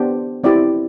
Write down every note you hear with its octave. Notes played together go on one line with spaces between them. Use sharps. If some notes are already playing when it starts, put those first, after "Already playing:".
Already playing: B3 D4 G4 C5
C4 E4 G4 D5